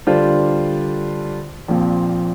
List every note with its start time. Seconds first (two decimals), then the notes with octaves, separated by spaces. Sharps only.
0.07 D3 G3 D4 F4 C5
1.68 A#1 A#2 F3 C4